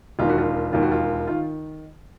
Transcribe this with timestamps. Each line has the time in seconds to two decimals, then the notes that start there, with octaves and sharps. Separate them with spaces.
0.19 E1 D#2 D#3 F4
0.29 F#4
0.38 F4
0.73 E1 D#2 D#3 F4
0.82 F#4
0.92 F4
1.27 D#3 F4